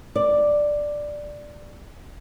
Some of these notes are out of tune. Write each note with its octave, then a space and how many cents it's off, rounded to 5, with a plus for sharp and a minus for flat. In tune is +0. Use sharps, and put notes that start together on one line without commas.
D5 +5